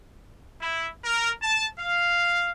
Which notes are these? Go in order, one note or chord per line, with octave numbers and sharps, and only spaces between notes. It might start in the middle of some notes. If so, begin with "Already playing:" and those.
E4
A#4
A5
F5